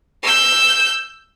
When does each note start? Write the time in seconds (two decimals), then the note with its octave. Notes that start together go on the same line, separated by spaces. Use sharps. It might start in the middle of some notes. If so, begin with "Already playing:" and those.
0.23 E6 G6